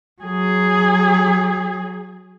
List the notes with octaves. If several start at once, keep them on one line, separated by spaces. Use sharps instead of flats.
F#3 G#4